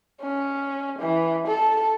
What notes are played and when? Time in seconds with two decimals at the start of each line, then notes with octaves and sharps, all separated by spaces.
0.21 C#4
0.99 E3
1.47 A4